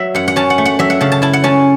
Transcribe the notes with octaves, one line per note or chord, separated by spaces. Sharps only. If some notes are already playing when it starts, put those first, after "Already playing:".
Already playing: F#3 E5
F#2 F#5
F#5
C#4 A5
F#5
A3
F#5
F#3 E5
F#5
C#3 A5
A5
E4 A5
F#5
C#4 A5